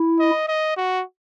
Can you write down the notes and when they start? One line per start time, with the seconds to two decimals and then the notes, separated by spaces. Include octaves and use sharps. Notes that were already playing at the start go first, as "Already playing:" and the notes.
Already playing: E4
0.19 D#5
0.48 D#5
0.77 F#4